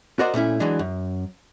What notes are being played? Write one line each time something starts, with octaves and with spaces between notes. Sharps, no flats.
F#4 A#4 C5 D5 D#5 F#5
A#2 A3 C#4 E4
E3 F#3 G#3 D4
F#2